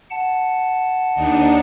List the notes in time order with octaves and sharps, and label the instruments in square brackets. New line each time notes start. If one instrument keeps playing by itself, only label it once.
[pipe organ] F#5 A5
[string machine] D#2 D4 D#4